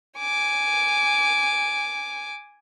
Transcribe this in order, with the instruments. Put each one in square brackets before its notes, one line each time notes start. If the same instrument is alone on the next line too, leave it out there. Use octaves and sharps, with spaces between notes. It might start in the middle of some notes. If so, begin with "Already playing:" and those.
[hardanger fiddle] G#5 D6